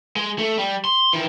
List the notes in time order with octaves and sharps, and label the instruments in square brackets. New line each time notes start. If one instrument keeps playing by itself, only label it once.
[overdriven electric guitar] G#3
A3
G3
C6
D#3 E3